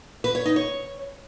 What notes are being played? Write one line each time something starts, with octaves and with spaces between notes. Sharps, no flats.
B4
C#5
D#4
C#5